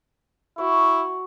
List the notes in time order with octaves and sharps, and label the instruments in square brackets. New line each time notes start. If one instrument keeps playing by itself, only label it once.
[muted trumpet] E4 [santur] F#4 F#5 C#6